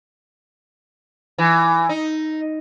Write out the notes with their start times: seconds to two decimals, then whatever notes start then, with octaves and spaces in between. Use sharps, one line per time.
1.38 E3
1.89 D#4